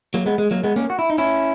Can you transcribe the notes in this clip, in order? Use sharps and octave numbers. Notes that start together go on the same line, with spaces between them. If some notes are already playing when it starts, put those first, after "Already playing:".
F#3 A#3
G#3 B3
G#3
F#3 A#3
G#3 B3
A#3 C#4
F#4
E4
D#4
C#4 E4